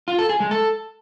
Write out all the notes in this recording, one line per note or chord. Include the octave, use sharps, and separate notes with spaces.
F4
A4
G#4
G#3
A4